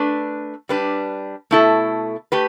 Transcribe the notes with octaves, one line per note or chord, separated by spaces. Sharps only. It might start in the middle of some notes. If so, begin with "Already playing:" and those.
Already playing: A3 D4 B4
G3 D4 B4
B2 A3 E4 A4
A3 G4 B4